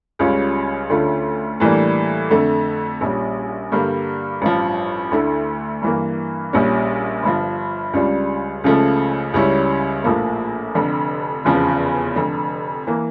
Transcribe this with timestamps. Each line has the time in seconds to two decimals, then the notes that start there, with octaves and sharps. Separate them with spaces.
0.19 C#2 C#3 G3 C#4 F4
0.90 D2 D3 A3 C#4 F4
1.60 A2 E3 G3 A#3 D4
2.30 F2 D3 A3
3.01 A#1 A#2 G3 C#4
3.72 G2 D3 G3 A#3
4.42 A1 G2 F3
5.11 D2 D3 A3 E4
5.82 G2 E3 A#3
6.53 A#1 A#2 G3 C#4
7.23 G1 G2 F3
7.93 C#2 C#3 G3 D4 F4
8.64 C#2 C#3 F3 A3
9.34 C#2 C#3 G3 C#4 E4
10.04 A#1 A2 F3 A#3
10.75 F1 F2 D3
11.45 F1 E2 C#3 F3
12.16 F1 F2 D3
12.87 E3 A#3